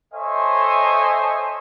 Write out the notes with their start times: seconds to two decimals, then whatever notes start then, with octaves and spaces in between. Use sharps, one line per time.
0.14 A4 C5 C#5 D#5 E5 G#5